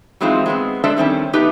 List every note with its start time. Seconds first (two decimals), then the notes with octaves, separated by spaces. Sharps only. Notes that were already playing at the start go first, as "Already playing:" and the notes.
0.21 E3 F#3 G#3 C4 D#4 F4
0.46 G#3 B3 C4
0.84 G#3 D4 A4 C5 D5 E5
0.97 D#3 G3 C4 C#4
1.33 A3 B3 D#4 G4 B4